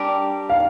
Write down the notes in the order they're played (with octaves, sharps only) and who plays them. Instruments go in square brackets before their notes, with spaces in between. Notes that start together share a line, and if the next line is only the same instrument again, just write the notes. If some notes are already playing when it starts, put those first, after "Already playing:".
Already playing: [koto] G3 D4 G4 A#4
[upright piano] F5